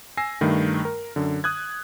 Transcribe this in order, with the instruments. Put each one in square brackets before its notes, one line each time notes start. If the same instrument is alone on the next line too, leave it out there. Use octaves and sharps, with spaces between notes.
[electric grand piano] G#5 E6 A#6 C7
G2 D#3 A3
A#4
F#2 D3
D#6 F#6 G#6